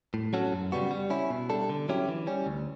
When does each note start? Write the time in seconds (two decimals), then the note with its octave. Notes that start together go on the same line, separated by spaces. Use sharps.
0.14 A2
0.33 F#3 C#4 F#4 A4
0.52 F#2
0.72 C#3 G3 B3 F#4
0.91 G3
1.10 C#4 E4
1.30 B2
1.50 G3 D4 A4
1.70 D3
1.89 F#3 C#4 E4 G4
2.08 E3
2.27 G3 C#4
2.46 D2